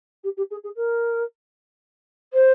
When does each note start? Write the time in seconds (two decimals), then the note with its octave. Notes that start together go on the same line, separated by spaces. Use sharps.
0.24 G4
0.37 G4
0.51 G#4
0.64 G#4
0.76 A#4
2.33 C5